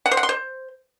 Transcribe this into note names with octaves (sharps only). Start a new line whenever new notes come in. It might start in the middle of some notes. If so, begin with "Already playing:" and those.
F#5
C5
F#5
C6
C5